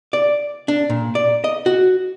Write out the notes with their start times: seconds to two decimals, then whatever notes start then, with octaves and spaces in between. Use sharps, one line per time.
0.13 D5
0.68 D4
0.90 A#2
1.15 D5
1.44 D#5
1.66 F#4